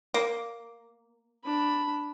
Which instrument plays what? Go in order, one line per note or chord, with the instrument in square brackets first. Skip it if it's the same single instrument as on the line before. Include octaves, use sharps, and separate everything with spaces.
[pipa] A#3
[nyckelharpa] D4 B5